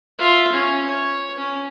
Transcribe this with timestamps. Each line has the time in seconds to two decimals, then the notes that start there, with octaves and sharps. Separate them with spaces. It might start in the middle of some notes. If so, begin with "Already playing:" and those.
0.19 F4 E5
0.52 C#4
0.87 C#5
1.37 C#4